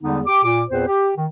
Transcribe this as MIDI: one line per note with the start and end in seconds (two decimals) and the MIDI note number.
0.02 0.20 40
0.02 0.20 50
0.02 0.20 55
0.02 0.20 56
0.02 0.20 59
0.02 0.20 63
0.26 0.40 67
0.26 0.40 86
0.43 0.61 46
0.43 0.61 86
0.69 0.85 40
0.69 0.85 46
0.69 0.85 60
0.69 0.85 71
0.69 0.85 72
0.86 1.10 67
1.16 1.26 51